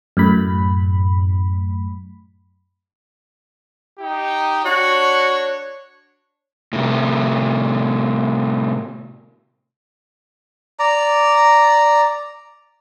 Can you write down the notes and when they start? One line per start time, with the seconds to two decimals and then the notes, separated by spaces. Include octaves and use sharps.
0.17 F#2 A2 B5
4.00 D#4 G4 G5
4.65 D4 F#4 C#5
6.73 A2 C3
10.79 D5 A#5